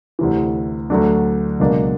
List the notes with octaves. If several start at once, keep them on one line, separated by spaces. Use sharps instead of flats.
D2 C3 E3
D2 D3 F#3 A3 D4
C#2 B2 F#3 A#3 D4